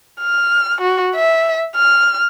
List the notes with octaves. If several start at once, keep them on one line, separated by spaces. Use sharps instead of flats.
F6
F#4
E5
F6